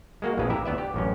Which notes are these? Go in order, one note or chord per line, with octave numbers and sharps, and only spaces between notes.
G#3 A#3 F#4
A#1 F2 A2 G#3 B4
E4 G4 E5 A#5
D2 B3 D5 E5
G4
A1 F#2 C#4